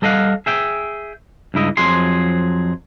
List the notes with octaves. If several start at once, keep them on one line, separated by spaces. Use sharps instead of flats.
G3 A4 D#5 F5 F#5
G#4 E5 G5
C#2 G2 E4 D#5
F2 F3 F#3 G#4 C6